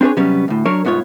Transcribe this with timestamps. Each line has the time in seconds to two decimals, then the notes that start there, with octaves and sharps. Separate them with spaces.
0.01 C4 D4 G#4 B4 C#5
0.17 C3 F#3 G3 B3 C#4
0.48 D2 A2
0.66 F#3 D4 A#4 C#5
0.85 C2 G#2 B3 F4 C#5